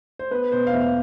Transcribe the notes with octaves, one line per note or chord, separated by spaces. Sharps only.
C5
B3 B4
B2 C5
F5
E2 E5